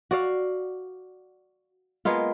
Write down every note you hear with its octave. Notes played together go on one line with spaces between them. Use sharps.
F#4 D5 F5
G#3 A#3 B3 F4